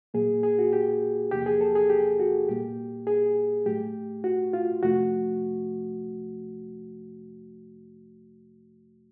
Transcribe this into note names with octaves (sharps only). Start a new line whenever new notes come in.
A#2 F#3 A#3 G#4
G#4
F#4
G4
E2 C3 F3 A#3 G4
G#4
A4
G#4
G4
F#4
A#2 G3 A#3 G4
G#4
A2 F#3 A3 G4
F#4
F4
F2 C3 F3 A3 F#4